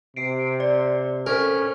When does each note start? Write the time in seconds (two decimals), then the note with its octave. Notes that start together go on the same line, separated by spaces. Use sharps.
0.16 C3 C7 D7
0.60 D5
1.26 C#4 A4 A#4 C5